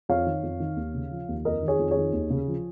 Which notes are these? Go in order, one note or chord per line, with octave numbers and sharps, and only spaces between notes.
F2 C#5 F5
D#3
F2
D#3
D#2
C#3
F3
D#2
F2 A#4 D#5
D#3
G#4 C#5
F2
G#4 C#5
D#3
D#2
C#3
F3